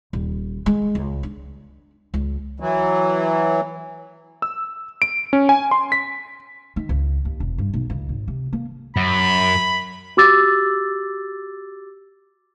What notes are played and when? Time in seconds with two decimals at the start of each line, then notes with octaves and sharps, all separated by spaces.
0.13 D#1
0.66 G#3
0.95 C#2
1.23 D4
2.14 C#2
2.60 E3 F#3
4.42 E6
5.02 D7
5.33 C#4
5.49 G#5
5.71 C6
5.92 B6
6.76 D#3
6.89 C#2
7.25 D#2
7.40 E1
7.58 G2
7.74 B1
7.90 C#2
8.09 G#1
8.28 C3
8.53 A#3
8.96 F#2 B5
10.17 F#4 G4 D6 E6 A6